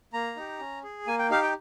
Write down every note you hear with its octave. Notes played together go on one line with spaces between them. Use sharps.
A#3 A#5
D#4 G4
C#4
G#4
A#3 G#5
G5
D#4 G4 F5
G5